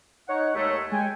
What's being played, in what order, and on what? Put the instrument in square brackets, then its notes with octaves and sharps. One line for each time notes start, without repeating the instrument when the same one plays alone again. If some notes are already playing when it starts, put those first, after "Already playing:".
[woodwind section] D#4 F#5 [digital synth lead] C#5
[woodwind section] D#2 G#3 A3
[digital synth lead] G#3 [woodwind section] G5 G#5